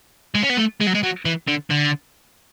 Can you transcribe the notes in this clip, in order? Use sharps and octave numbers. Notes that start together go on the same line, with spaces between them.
G#3
C#4
B3
A3
G#3
F#3
G#3
F#3
E3
D3
D3